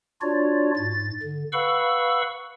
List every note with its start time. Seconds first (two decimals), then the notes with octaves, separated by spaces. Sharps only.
0.22 D4 F4 F#4 C#5 D5
0.76 G#2 A6
1.23 D3
1.53 B4 F5 F#5 B5 C#6 E6